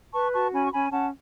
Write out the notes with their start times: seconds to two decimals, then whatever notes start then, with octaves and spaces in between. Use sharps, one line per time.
0.13 B4 A5 C#6
0.33 F#4 A5 C#6
0.53 C#4 G#5 B5
0.66 C#6
0.73 C#4 G#5 B5
0.92 C#4 F#5 A5